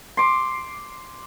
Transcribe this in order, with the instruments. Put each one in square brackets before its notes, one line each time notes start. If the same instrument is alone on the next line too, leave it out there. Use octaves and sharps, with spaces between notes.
[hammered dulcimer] C6 D6